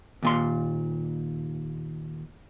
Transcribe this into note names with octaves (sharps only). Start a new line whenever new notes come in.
D#2 A#2 C6